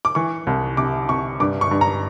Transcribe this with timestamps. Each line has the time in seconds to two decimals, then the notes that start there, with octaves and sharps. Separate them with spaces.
0.05 D6
0.15 E3 C#6
0.47 C2
0.77 C3 D6
1.09 C3 C#6
1.40 G2 D6
1.61 C#6
1.71 G2
1.81 A#5